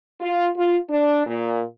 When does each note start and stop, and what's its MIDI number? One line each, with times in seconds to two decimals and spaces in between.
0.21 0.49 65
0.57 0.77 65
0.89 1.23 62
1.27 1.62 46